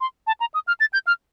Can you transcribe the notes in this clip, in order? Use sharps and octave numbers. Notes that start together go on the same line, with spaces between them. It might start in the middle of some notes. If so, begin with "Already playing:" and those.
C6
A5
A#5
D#6
F6
A6
G6
F6